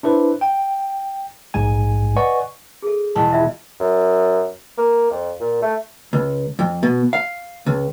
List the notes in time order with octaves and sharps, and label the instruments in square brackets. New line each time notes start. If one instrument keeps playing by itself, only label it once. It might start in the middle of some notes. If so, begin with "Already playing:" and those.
[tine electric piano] D4 E4 B4 C5
G5
A#1 G#2 G#3 G#5
B4 D5 D#5 F#5 G#5 C#6
[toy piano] G#4 A4
[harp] E1 [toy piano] A5
[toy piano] F4 D5 E5
[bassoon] F#2
A#3
F2
A#2
A3
[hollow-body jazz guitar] C#2
F2
B2
F5
C#2